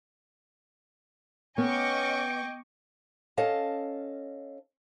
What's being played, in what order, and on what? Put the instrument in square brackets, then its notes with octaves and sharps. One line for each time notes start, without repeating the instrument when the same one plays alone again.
[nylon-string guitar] B3 [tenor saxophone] C#4 [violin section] D#5 C#6 D6 [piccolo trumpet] G5
[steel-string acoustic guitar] C#4 A4 D#5 F5 A5